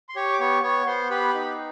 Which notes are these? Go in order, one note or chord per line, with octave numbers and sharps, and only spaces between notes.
C6
G4 C#5 C#6
D6
B3 C#5 C#6
B3 C#5 C#6
B3 C5 C6
G4 B4 B5
D#4